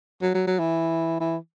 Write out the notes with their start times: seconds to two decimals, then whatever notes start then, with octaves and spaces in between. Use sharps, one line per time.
0.22 F#3
0.34 F#3
0.47 F#3
0.59 E3
1.20 E3